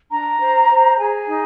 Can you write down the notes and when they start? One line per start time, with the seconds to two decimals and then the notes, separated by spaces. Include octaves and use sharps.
0.10 D4 A#5
0.39 C5
0.69 C5
0.98 G#4 G#5
1.27 D#4